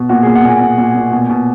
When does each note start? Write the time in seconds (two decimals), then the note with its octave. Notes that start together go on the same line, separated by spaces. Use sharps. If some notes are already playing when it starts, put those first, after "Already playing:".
Already playing: B2
0.09 A#2 F#4
0.22 A#2 G#4
0.36 F#5
0.44 A#2 G#5
0.61 A#2
0.78 A#2
0.95 A#2
1.12 B2
1.29 B2